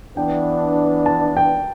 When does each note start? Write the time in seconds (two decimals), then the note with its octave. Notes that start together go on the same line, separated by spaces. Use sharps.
0.17 E3 B3 D4 G5
1.06 A5
1.37 G5